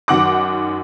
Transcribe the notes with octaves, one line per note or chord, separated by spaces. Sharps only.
F#2 D#3 F#5 D6